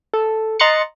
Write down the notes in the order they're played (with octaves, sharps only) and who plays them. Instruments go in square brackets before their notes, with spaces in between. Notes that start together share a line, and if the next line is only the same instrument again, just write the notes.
[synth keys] A4
D#5 A#5 C6 F#6 A6 C#7